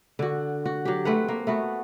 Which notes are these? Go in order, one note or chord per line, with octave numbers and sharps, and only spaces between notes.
D3 F#4
F#4
F#3 G4
A3 C4 B4 F#5
A#3
A3 B3 F#4